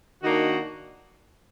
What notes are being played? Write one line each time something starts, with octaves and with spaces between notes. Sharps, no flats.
D#3 A#3 D4 D#4 F#4